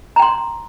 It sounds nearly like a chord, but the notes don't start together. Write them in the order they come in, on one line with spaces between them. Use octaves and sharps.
A#5 G5 C6